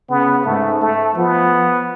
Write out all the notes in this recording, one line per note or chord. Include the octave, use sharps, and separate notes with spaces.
C#3 B3
G#2 A3
A3
F3 B3